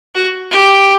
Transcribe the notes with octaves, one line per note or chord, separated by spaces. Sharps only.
F#4
G4